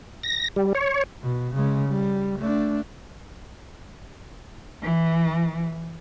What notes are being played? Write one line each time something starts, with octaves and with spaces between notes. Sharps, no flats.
A#6
G3
C#5
B2
C#3 G#3
G3
A3 D4
E3